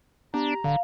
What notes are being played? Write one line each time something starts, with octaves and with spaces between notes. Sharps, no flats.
B3 D4 G4 A#5
D1 D3 F5